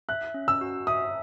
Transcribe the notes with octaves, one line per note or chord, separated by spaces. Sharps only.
E5 F#6
C#4
E6
F#4
E5 D#6